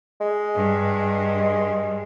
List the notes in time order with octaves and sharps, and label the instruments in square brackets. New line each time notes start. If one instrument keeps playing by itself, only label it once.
[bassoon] G#3
[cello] G2